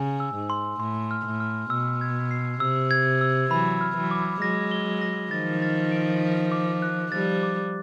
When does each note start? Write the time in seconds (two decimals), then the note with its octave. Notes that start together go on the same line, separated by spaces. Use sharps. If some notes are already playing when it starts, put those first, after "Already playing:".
Already playing: C#3 G#5
0.20 E6
0.35 G#2
0.50 C6
0.80 A2 C6
1.11 F6
1.26 A2
1.40 F6
1.70 B2 E6
2.01 G#6
2.31 C7
2.60 C3 E6
2.91 G#6
3.21 E6
3.51 E3 F#3 B5
3.81 F6
3.96 E3 F#3
4.11 D6
4.42 F#3 G#3 A#6
4.71 G7
5.01 A#6
5.31 D#3 F3 A6
5.62 A6
5.92 D7
6.22 B6
6.52 D6
6.82 F#6
7.12 F3 G3 A6
7.43 D6